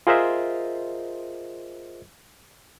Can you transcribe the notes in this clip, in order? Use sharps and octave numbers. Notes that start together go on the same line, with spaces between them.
F4 G#4 A#4 C5 D#5 E5